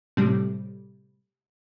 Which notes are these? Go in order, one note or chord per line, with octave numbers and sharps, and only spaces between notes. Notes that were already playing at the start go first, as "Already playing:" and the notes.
A2 C3 G3